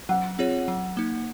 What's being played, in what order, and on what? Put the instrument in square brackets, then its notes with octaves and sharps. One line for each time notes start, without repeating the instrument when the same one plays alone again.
[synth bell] F#3 [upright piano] F#5
[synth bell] C4 F4 G#4 C#5
F#3
A#3 D#4